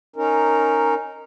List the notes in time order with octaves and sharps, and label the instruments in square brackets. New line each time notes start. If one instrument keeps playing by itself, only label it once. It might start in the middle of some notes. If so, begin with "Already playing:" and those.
[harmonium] C#4 D#4 A#4